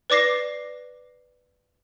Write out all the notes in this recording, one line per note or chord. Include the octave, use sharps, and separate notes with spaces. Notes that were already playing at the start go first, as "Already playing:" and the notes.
B4 D5 D6 A#6 C7